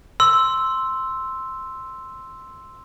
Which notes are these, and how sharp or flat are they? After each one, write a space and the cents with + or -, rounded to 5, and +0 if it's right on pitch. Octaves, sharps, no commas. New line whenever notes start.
C6 +0 E6 +0